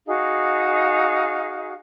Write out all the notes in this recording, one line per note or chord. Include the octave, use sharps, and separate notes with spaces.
D#4 F#4 G#4 F5